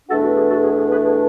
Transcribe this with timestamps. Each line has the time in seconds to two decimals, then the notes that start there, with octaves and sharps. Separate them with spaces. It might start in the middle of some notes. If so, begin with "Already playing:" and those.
0.09 E2 B2 A3 D4 F#4 A4
0.23 F#4
0.37 G#4
0.50 F#4 A4
0.64 G#4
0.78 G#4
0.91 G#4 B4
1.05 G#4